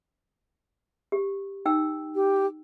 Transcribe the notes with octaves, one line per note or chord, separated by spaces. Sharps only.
G4
D#4 G5 E6
G4